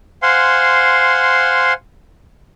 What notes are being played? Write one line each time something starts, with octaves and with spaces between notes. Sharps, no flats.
C5 F5 F#5 G#5 C6